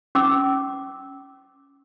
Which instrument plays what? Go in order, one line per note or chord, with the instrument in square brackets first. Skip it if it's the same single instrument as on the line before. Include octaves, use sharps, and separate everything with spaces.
[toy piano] C#4 D6 E6